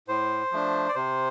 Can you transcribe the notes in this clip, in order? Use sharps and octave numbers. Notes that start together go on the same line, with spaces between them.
A2 C5
F3 A3 D4
D5
C3 C5